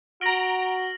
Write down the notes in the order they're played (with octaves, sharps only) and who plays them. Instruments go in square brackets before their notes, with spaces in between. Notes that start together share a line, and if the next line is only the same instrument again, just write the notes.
[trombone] F#4 [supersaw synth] A#5 D7 [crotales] F6 A#6 F#7